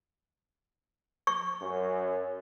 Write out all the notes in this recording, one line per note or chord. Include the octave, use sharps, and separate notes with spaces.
C#6
F#2